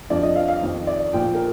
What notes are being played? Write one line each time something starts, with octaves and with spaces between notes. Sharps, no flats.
F2 D3 F3 D5
D#5
F5
F5
F2 D#3
D5
A#2 F3 G5
A#4